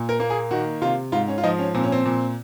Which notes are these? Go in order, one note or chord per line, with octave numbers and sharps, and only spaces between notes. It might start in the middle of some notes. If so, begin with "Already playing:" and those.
Already playing: A#2
A#4
A#3
G#4
D#3 F#4
C3 F4
G#2 F4
C#4
F4
F3 D#4
C#4
A#2 C4
C#4
C4
A#2